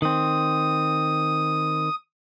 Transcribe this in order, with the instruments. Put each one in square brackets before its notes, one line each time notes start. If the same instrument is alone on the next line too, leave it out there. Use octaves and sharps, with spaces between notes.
[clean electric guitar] D#3 C4 [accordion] D#6